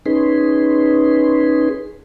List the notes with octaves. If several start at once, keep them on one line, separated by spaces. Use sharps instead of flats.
C#4 D#4 G#4 B4 C6